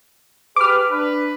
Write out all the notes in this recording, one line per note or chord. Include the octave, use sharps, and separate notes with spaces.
G4 G#4 B4 D6 F6
D4 B4